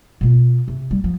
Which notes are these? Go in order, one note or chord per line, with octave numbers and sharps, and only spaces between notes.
B2 F4
C3
G3
F3